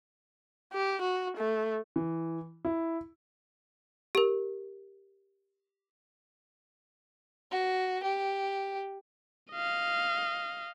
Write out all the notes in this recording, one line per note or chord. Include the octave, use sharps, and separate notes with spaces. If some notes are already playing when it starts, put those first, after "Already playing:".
G4
F#4
A3
E3
E4
G4 A#4
F#4
G4
D#5 F5